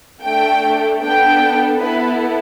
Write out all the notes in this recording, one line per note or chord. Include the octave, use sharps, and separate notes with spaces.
A3 D4 A4 G5
B3 D4 A4 G5
B3 E4 A4 B4